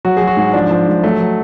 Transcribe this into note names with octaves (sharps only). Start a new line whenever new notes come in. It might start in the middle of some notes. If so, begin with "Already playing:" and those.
F#3 F#4
F#3 G#4
F#4
G#2
F3 D4
F3
G#2
F#3 A3
F#3